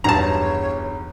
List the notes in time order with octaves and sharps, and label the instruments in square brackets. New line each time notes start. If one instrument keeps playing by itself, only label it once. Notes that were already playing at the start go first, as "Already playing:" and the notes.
[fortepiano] B1 G2 [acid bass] E2 [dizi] C#5 [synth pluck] A5 A#5